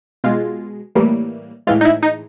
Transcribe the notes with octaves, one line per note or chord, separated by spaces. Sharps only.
B2 G#3 F4
A2 E3 G3 A#3
A2 E3 G#3 F4
D#4
E4
D#4